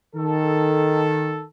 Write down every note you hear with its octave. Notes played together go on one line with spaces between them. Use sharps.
D#3 A4